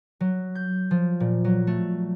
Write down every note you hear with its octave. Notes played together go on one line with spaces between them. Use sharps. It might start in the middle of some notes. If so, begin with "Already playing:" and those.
F#3
G6
F3
A#2
F#3
A3